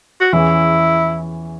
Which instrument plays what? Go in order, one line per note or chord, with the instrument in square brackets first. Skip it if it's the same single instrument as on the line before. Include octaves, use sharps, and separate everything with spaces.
[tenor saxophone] F#4
[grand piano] E2 E3 C#4 G#4 E5 [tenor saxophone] E4